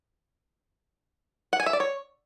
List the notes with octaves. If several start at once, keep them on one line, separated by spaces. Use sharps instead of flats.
F#5
G#5
E5
D5
C#5